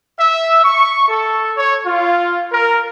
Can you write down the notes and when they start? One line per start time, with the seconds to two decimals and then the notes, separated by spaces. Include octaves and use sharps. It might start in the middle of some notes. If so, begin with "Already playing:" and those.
0.17 E5
0.63 C#6
1.08 A4
1.56 C#5
1.85 F4
2.52 A#4